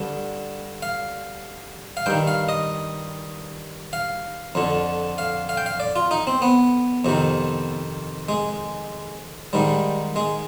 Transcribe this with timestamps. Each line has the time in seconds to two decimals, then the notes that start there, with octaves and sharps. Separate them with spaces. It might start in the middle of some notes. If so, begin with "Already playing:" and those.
Already playing: G2 D3
0.82 F5
1.97 F5
2.06 G2 D#3 G5
2.27 F5
2.49 D#5
3.93 F5
4.55 F2 D3
5.18 F5
5.49 F5
5.57 G5
5.66 F5
5.80 D5
5.96 F4
6.11 D#4
6.27 C4
6.42 B3
7.05 F2 C3 D#3
8.29 G#3
9.53 G#2 D#3 G3
10.16 G#3